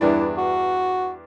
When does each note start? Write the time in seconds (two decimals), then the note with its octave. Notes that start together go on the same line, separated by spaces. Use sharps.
0.01 E2 G2 D4 E4
0.38 F#4